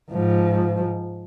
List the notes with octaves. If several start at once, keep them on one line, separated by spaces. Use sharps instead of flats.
G#2 F3